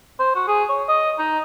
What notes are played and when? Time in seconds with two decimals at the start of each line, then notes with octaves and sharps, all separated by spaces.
0.19 C5
0.35 F#4
0.48 G#4
0.69 C#5
0.88 D#5
1.19 D#4